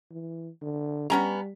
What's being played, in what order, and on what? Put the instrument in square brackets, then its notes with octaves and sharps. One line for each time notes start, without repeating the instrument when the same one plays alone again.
[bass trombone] E3
D3
[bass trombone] G3 [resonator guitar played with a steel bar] B3 C#4 A#5